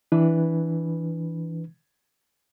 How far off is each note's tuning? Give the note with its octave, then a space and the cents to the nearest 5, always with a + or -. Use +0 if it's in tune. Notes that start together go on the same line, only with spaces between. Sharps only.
E3 -5 D4 +0 B4 +0